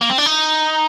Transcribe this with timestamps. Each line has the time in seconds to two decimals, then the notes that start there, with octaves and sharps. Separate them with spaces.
0.01 A#3
0.10 C4
0.18 D4
0.26 D#4